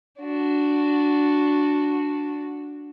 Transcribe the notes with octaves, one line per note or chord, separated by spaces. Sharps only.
D4 F#4